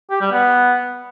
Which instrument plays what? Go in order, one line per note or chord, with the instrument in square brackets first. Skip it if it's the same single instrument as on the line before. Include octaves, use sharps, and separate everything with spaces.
[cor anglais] G4
G3
B3